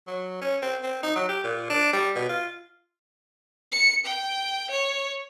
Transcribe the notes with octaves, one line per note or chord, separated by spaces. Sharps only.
F#3
C#4
C4
C4
D#4
F#3
G4
A#2
D4
G3
B2
F4
C#7
G5
C#5